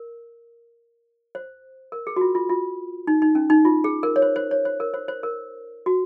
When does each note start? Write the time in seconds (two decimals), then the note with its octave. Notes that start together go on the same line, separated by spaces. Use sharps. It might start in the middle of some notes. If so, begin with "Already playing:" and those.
Already playing: A#4
1.35 C5
1.92 A#4
2.07 G#4
2.16 F#4
2.21 F4
2.35 F4
2.49 F4
3.07 D#4
3.22 D#4
3.35 C#4
3.50 D#4
3.65 F4
3.84 G#4
4.03 A#4
4.16 C#5
4.22 C5
4.36 C5
4.51 C#5
4.65 C5
4.80 A#4
4.94 C5
5.08 C5
5.23 A#4
5.86 F#4